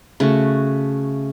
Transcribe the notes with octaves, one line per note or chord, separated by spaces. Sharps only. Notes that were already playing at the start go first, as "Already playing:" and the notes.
C#3 A3 F#4 C#6